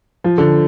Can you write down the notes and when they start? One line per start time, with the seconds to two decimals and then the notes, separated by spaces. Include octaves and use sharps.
0.24 F3
0.38 D3